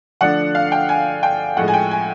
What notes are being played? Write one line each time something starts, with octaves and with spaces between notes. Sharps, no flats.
D3 F3 A3 D4 F#5
F5
G5
G#5
G5
A2 F3 G#3 F#5
G#5
G5
G#5